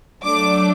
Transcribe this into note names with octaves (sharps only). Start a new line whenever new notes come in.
F#3 A3 D4 D6